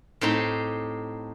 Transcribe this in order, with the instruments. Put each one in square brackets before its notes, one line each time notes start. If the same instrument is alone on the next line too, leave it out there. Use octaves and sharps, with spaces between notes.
[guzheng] A2 C4 D#4 G4